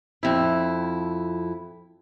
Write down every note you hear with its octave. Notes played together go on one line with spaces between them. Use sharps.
F2 E4